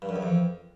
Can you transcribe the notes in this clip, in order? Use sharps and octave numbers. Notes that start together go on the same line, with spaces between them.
G2
F#2
E2
F2